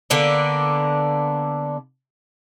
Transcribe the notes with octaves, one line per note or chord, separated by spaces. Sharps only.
D3 A#3 B3 D4